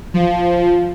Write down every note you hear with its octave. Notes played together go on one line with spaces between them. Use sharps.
F3